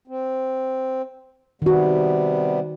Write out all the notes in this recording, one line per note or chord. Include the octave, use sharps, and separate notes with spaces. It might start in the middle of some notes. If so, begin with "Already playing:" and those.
C4
C3 D#3 G3 B3 F#4